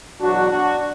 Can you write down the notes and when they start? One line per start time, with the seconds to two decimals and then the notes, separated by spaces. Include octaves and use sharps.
0.21 E2 B2 F#3 D4 F#4
0.51 D4 F#4